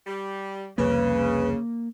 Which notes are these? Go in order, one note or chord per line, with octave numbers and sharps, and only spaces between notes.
G3
C2 F2 C#3 A#3 B4